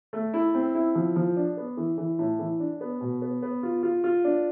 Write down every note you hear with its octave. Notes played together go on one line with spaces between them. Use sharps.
A3
E4
C4
E4
F3
F3
D4
B3
E3
E3
A2
E3
D4
B3
B2
B3
B3
F4
F4
F4
D4